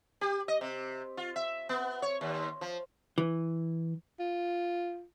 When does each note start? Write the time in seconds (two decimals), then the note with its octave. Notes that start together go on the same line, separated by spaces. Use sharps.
0.21 G4
0.48 D#5
0.61 C3
1.17 F4
1.36 E5
1.69 B3
2.02 C#5
2.21 D#2
2.61 F3
3.18 E3
4.19 F4